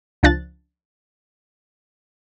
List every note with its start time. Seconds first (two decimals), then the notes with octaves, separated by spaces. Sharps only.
0.23 C#2 F3 D4 F#6 A6